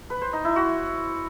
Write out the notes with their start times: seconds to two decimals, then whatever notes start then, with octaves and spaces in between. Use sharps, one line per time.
0.10 B4
0.22 C5
0.33 D#4
0.45 E4
0.56 F#4